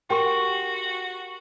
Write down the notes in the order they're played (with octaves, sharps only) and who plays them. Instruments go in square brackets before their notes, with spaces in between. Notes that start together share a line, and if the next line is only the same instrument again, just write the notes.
[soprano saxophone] F#4 [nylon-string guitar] G4 A#4 [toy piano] G5 C#6